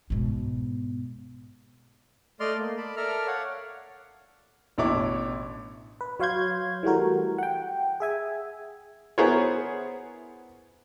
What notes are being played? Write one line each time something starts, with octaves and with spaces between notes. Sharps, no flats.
G#2 B2
A3 D5 D#5 C6 F6
A#3
D5 A5 B5
A4 A#4 D5 E5 A#5 F6
C#5 F5 F#5
A1 B2 D4 E4 C#5 D6
B4
F#3 C#5 F5 C6 G6 G#6
E3 G3 A3 F#4 A#4
F#5 G5
G#4 E5 G#5
B3 E4 G#4 A#4 C5 C#5